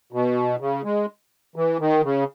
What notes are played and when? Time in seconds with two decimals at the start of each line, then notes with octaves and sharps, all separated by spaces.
0.13 B2
0.60 C#3
0.84 G#3
1.56 E3
1.80 D#3
2.04 C#3